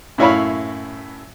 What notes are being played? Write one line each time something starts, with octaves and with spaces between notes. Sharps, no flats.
F#2 A2 E4 C#5 F5 B5